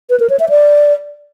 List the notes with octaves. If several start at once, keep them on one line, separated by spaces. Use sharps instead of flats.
B4
A#4
C#5
E5
D5